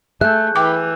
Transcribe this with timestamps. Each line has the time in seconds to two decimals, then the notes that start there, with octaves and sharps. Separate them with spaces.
0.21 A3 G#4 E5 F#6 G6
0.56 E3 G5 D6